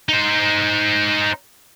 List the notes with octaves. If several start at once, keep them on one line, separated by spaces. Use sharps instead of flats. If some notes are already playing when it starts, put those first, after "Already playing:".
D#4 C5